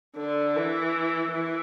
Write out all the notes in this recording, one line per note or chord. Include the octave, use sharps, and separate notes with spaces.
D3
E3
E3